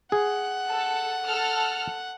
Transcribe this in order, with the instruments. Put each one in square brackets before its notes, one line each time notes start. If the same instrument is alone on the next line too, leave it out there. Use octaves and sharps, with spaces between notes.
[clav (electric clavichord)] G#4 [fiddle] F#5
[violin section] A4
A4 F6